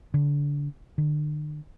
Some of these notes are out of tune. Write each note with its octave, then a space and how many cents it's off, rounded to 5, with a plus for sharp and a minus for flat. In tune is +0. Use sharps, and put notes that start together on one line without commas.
D3 -25
D3 +40